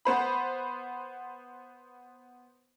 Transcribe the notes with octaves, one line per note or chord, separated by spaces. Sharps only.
B3 C5 B5